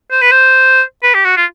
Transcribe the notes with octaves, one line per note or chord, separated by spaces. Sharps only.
C5
B4
C5
B4
G4
F#4
F4